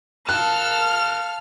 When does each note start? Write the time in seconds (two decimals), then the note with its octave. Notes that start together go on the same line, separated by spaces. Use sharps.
0.29 A4 A#4 F5 A5 F6 F#6